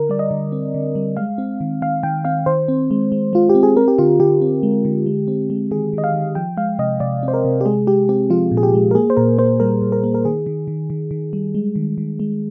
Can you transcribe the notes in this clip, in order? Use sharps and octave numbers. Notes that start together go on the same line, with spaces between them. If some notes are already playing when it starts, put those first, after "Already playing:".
Already playing: D3 A#4
G3 D5
D#5
D3
C4
D3
G3
G#3 F5
C4
D#3
D#3 F5
D#3 G5
C4 F5
D#3 C5
C4
G#3
G#3
G#3 F4
G4
C4
G#4
C4 A#4
G4
D3 F4
D3 G4
C4
G#3
D3
G#3
C4
G#3
D#3 G#4
D#3 D#5
F5
D#3
F3 G5
G#3 F5
C3 D#5
C3 D5
C4
C5
A#4
C3
G4
G#3 G#4
G#3 G4
C4 G4
F3 F4
A#2
G#4
G4
G#3
A#4
A#3 G#4
C5
A#2 A#4
A#3 C5
G3 A#4
A#2
A#4
A#3
A#4
D#3 G#4
D#3
D#3
D#3
D#3
G3
G#3
D#3
D#3
G#3